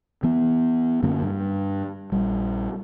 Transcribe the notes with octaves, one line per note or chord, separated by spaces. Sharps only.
E3 B3
F#2 D3 A#3 C#4
G2
A#1 G3